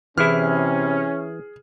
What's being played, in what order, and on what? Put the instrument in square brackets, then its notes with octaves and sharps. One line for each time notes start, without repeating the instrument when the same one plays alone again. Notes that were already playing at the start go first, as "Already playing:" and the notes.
[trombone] C3 [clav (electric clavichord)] E3 E4 [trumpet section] C#4 [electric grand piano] G#4 F6